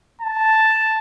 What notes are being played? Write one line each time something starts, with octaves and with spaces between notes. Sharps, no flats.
A5